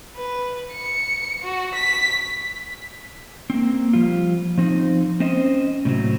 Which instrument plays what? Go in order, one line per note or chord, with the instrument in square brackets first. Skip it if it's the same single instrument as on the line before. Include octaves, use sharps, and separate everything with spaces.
[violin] B4
C#7
F#4
B6
[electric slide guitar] A#3 C4
F3 G3 F4
F3 C4 D#4
C4 C#4 C5 D#5
A2 C3 F#3